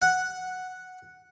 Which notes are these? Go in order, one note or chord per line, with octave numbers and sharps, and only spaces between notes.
F#5